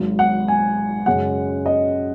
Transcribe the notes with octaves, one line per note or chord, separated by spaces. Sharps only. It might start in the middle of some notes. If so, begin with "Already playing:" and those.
Already playing: G#1 G#2 F#3
F#5
G#5
F#2 C#3 G#3 F#5
D#5